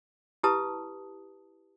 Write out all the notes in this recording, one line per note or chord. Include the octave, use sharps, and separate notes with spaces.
E4 G4 B4 A5 D#6